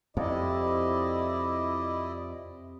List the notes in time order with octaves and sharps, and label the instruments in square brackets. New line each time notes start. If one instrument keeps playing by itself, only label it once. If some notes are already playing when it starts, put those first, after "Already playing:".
[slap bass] F2 [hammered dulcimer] C3 [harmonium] E4 D5 D#5